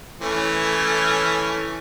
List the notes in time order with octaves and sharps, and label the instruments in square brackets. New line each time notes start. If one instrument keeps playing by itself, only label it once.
[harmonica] E3 A3 C#4